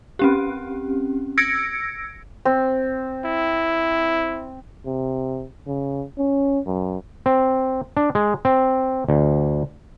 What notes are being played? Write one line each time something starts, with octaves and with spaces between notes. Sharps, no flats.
C4 C#4 G4
E6 G#6 A#6 C#7 D7
C4
E4
C3
C#3
C#4
F#2
C4
D4
G#3
C4
D2